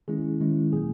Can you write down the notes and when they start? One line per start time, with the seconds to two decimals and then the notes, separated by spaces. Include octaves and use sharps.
0.08 D#3 G#3 C#4 E4 G#4
0.40 D#3 G#3 C#4 E4
0.73 A#2 F#3 A#3 G#4